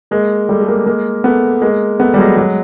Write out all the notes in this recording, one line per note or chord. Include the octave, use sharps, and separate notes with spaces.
G#3 A#3
G3 A3
A3
G#3 A#3
G#3 A#3
A3 B3
G#3 A#3
A3 B3
G3
F#3 G#3
F#3 G#3